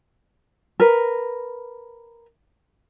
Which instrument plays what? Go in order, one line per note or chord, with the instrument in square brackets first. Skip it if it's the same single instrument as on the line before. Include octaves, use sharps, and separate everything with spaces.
[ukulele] A#4 B4